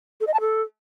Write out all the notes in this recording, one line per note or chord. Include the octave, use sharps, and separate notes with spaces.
A4
D#5
A5
A4